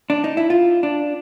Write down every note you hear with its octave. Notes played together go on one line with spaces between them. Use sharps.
D4
D#4
E4
F4
D4